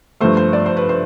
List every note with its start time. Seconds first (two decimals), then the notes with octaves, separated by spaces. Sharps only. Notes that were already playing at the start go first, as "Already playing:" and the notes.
0.21 G2 F3 A3 C5
0.37 C5
0.53 D5
0.66 C5
0.77 B4
0.89 C5